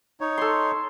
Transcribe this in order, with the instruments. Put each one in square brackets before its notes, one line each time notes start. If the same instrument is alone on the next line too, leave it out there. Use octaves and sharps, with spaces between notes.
[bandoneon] D#4 C#5
[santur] A4 C6